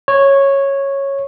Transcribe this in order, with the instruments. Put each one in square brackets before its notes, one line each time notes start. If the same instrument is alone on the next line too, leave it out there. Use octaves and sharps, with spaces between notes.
[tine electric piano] C#5